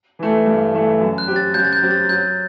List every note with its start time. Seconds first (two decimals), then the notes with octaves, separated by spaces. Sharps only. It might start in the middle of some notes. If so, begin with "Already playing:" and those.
0.19 E3 A3
0.46 G2
0.73 E3 A3
1.00 F#2
1.18 F#6
1.27 F#3 C4 G4
1.36 A6
1.54 F#2 G6
1.65 A6
1.73 G6
1.82 F#3 C4 G4
1.91 A6
2.09 F#3 G6